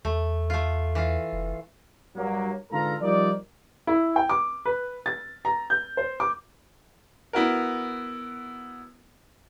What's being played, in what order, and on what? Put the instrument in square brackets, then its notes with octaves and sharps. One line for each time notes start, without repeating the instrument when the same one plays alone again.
[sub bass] E2 [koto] A3
[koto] A3 F4
E3 F4
[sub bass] F1
[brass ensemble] G2 F#3 A#3
G#2 D3 F4 A4 B4 A#5
F3 G3 A#3 D#4 A#4 D5
[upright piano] E4
G5
D6
B4
A6
A#5
G6
C5
D6
[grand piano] B3 E4 F#4 A#4